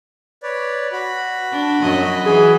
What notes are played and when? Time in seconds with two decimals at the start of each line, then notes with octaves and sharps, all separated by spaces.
0.43 B4 C#5 D5
0.93 F#4 B5
1.51 D4
1.80 F#2 F#3 D#5
2.26 E3 G#4